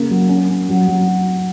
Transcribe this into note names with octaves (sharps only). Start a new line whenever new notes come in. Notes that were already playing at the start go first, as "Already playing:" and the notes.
Already playing: C#3 A#3
F#3
C#4
C#4
F#3
F#3